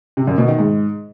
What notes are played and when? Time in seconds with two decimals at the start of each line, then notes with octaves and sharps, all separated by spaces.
0.17 C3
0.27 F#2
0.38 B2
0.48 D#3
0.59 G#2